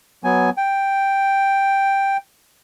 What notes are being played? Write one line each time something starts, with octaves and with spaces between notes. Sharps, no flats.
F#3 B3 G#5
G5